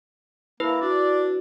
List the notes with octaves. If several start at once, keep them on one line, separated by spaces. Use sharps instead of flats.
A#3 E4 B4 E5 B5
D4 F#4 D5